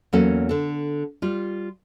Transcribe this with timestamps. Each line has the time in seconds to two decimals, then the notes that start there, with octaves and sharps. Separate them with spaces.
0.13 E2 F#3 A#3 C#4 A4 F#5
0.49 D3 A4
1.22 G3 F4